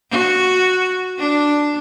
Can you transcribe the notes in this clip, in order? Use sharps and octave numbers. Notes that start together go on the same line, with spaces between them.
F#4
D4